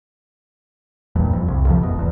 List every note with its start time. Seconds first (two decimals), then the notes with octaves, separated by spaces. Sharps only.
1.15 E1 E2 G2 A#2
1.33 F2
1.48 C2
1.66 F2 C3 D#3 F3
1.79 F#1 G#2 B2
1.95 D#1 E2